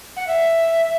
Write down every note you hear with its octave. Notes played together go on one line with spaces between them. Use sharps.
F#5
E5